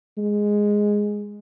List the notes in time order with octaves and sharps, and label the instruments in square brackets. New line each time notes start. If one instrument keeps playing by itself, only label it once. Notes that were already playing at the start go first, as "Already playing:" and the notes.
[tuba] G#3